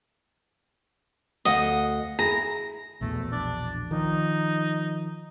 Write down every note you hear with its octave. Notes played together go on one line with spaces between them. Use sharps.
D2 D#5 F5 F#5
E4 G#4 A#5
A#1 E2 B2 A3
D4
D#3 F3 D#4